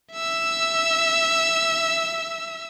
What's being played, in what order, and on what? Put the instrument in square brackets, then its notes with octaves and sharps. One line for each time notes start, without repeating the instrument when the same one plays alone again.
[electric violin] E5 E6